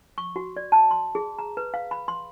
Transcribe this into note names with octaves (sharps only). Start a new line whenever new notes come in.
C#6
F#4
D5
A5
C6
G#4
A#5
B4
F5
B5
C6